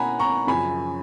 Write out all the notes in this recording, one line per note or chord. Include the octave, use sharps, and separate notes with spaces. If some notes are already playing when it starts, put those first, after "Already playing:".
Already playing: B2 A#3 C#4 F#5 G#5 A#5 B5
A#5 C#6
F#2 C#3 F3 G#5 B5